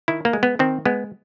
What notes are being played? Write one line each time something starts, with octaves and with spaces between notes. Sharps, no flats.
D#3 E4
A#3
G#3
B3
D#3 C4
G#3 B3